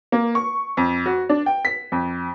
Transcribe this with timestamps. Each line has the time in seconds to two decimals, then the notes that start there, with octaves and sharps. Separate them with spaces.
0.12 A#3
0.35 C#6
0.77 F2
1.06 F#4
1.29 D4
1.46 G5
1.65 B6
1.92 F2